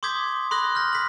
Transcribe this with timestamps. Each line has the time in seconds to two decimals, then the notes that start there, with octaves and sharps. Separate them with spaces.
0.03 C6 D6 D#6 G6 G#6 B6
0.51 B5 C6 D#6 F#6 A#6 F#7
0.75 F6 G6 A#6
0.93 B6 F#7